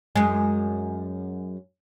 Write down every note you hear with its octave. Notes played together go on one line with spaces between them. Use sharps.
F#2 G#3